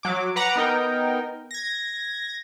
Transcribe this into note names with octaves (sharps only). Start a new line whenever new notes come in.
F#3 D6
B4 F#5 A#5 D6
B3 D#4 A#4 G5
G#6 A#6